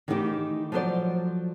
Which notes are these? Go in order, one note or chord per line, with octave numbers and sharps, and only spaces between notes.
D#3 E3 A3 D#4 F#4 G4
F3 F#3 A4 A#4 C5 D5